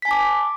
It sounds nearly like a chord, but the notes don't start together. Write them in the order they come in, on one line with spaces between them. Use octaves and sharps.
B6 G#5 A5 D6